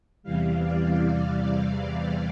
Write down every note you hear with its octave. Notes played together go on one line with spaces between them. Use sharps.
E2 C3 E3 G3 F5
D5